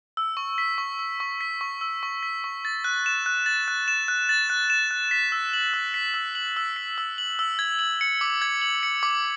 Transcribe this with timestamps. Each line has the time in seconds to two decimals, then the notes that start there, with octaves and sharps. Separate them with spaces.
0.17 E6
0.37 C#6
0.58 B6
0.78 C#6
0.99 E6
1.20 C#6
1.41 B6
1.61 C#6
1.81 E6
2.03 C#6
2.23 B6
2.44 C#6
2.65 A6
2.84 F#6
3.06 E7
3.26 F#6
3.46 A6
3.68 F#6
3.88 E7
4.08 F#6
4.29 A6
4.50 F#6
4.70 E7
4.91 F#6
5.11 B6
5.32 E6
5.53 F#7
5.74 E6
5.94 B6
6.14 E6
6.35 F#7
6.57 E6
6.76 B6
6.98 E6
7.18 F#7
7.39 E6
7.59 G#6
7.79 F#7
8.01 C#7
8.21 D6
8.42 G#6
8.62 F#7
8.83 C#7
9.03 D6